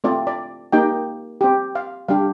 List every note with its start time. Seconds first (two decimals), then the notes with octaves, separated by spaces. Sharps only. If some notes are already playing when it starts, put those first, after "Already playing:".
0.04 A3 C4 F4 D5
0.27 D5
0.73 A#3 D#4 G4 G5
1.41 C4 G4
1.75 F5
2.08 G3 D4 G4 F5